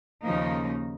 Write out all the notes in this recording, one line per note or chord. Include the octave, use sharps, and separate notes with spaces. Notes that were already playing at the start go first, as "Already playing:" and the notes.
D#2 C#3 F3 A#3 D#4